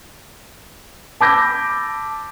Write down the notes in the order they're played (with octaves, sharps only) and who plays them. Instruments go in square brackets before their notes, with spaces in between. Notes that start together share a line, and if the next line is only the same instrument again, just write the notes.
[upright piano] A5 B5 D6 E6 G6 A#6